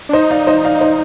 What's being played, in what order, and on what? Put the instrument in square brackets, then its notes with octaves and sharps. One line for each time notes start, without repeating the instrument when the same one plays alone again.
[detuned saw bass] D4
[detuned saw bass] D#4 [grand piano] C5 D#5
[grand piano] D5 F5
C5 D#5
D5 F5
C5 D#5